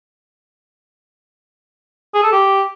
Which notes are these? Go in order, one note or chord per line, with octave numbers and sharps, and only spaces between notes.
G#4
A4
G4